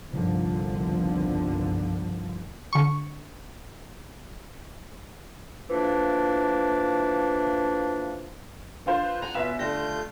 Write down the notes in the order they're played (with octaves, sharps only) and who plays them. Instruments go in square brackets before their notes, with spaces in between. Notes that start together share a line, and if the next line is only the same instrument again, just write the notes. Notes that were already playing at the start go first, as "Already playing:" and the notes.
[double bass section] G1 C2 G2 D3 D#3 F3
[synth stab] D3 C#6
[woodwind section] A2 E3 F3 A#3 D4
[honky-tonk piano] D3 F4 C5
[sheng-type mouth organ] B4
[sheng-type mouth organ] F#5 G#5 [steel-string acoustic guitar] A#5
[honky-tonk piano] B2 E5 E7 [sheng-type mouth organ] B3 F4 [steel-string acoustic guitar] C#4
[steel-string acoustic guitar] D3 G4 [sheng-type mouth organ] A3 F4 G6 [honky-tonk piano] A#6